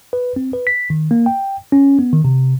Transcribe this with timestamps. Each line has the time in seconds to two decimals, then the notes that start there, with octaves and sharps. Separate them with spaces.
0.13 B4
0.36 C4
0.53 B4
0.67 B6
0.90 D#3
1.11 A#3
1.26 G5
1.72 C#4
1.99 B3
2.13 D#3
2.25 C3